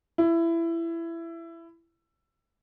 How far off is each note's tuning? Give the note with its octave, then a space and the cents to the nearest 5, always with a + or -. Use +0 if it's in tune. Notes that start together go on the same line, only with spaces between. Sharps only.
E4 +20